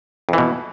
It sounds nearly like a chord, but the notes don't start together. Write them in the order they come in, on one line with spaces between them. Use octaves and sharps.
F2 E3 B2